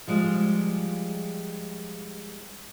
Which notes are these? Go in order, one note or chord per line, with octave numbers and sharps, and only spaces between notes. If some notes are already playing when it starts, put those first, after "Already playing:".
F3 G3 G#3